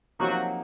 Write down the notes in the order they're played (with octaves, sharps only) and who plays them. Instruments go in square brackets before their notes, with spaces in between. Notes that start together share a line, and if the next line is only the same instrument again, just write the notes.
[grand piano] C3 F3 A#3 D#4 [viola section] F#3 F#4